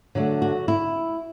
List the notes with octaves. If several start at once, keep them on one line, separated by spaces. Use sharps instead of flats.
D3 F#3 A3
F#4
E4